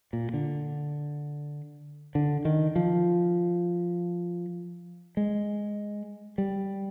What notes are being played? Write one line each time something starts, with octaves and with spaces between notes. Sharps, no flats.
A#2
D3
D3
D#3
F3
G#3
G3